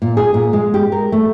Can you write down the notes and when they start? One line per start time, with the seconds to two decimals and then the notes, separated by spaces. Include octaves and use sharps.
0.02 A#2
0.17 G#4
0.34 A#2
0.53 G#3
0.74 G4
0.92 A#4
1.12 A3